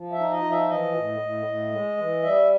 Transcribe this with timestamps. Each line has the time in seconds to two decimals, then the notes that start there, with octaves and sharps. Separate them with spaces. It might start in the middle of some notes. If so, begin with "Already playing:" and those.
Already playing: F3
0.12 E5
0.19 D#4
0.31 D#5
0.44 F3
0.51 E5
0.69 E3 D#5
0.95 A2
1.20 A2
1.46 A2
1.71 G#3
1.97 E3
2.22 G3 E5